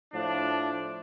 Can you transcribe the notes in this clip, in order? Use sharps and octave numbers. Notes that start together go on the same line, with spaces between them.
A2 F3 D4